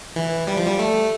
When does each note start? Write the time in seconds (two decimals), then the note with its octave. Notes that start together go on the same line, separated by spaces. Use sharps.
0.16 E3
0.47 G3
0.57 F3
0.66 G3
0.79 A3